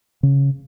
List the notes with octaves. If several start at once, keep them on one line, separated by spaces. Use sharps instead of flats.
C#3